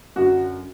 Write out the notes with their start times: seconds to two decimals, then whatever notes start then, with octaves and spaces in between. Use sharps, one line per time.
0.16 F#2 D3 F#3 F#4